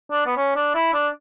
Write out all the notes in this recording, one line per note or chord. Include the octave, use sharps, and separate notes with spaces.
D4
B3
C#4
D4
E4
D4